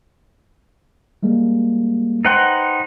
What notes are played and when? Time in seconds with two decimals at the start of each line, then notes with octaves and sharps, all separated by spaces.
1.23 G3 G#3 A#3
2.25 D#4 B4 C5 F#5 G5 C6